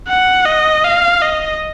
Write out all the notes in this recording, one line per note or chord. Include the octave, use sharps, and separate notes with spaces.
F#5
D#5
F5
D#5